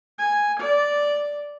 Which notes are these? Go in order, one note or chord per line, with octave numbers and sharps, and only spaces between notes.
G#5
D5